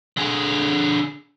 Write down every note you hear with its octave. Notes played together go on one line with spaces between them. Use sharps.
D3 G#4